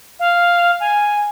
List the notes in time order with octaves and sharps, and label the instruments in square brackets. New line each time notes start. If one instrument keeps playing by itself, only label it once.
[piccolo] F5
G#5